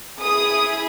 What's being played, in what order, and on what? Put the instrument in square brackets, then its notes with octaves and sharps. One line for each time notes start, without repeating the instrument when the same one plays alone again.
[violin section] E4 G#4 D#6